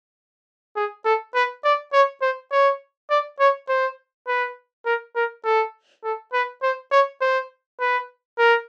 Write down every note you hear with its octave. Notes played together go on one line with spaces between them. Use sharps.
G#4
A4
B4
D5
C#5
C5
C#5
D5
C#5
C5
B4
A#4
A#4
A4
A4
B4
C5
C#5
C5
B4
A#4